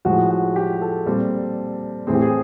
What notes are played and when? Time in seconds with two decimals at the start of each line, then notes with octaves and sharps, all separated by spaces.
0.05 A2 F3 G#3 F#4
0.31 F#4
0.56 G4
0.82 A4
1.06 A#2 G3 C4
2.07 A2 E3 A3 C4 G#4
2.15 G4
2.21 G#4